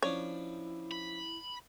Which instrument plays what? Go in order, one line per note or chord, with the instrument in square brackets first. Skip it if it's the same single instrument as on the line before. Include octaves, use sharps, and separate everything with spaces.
[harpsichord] F3 C#4 D4 [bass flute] E4 [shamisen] C#5
[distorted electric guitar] B5